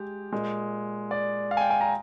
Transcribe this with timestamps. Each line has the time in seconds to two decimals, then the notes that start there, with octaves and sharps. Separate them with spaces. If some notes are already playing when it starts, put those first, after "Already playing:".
Already playing: G#3 G4
0.32 A#2 G#3
1.11 D5
1.51 F5
1.57 G#5
1.61 G5
1.71 G#5
1.81 A#5